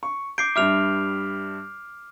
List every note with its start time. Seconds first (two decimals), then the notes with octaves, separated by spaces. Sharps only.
0.03 C#6
0.38 D6 G6 C7 D7
0.56 G2 G3 E5 D6 F6 F7